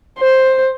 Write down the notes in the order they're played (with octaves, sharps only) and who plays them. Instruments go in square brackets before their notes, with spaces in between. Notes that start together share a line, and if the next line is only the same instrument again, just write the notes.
[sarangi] C5